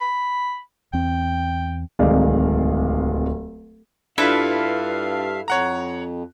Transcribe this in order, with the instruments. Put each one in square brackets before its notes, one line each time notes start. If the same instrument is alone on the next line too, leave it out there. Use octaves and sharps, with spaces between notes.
[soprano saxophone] B5
[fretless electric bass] E2 C4 [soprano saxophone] G5
[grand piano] D1 C2 D#3 G#3 D5 F5
[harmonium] G2 E5 F5 [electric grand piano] D4 F4 [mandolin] E4 [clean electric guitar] A4 B4
[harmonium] F2 [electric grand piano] C#5 F#5 A#5